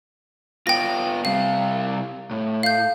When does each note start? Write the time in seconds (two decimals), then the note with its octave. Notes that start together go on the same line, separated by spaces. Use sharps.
0.67 B3 F4 G5 A#6
1.25 C3 G3 F5
2.31 A2
2.63 F5 G6